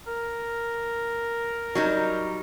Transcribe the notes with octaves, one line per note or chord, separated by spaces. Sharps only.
A#4
F#3 G3 D#4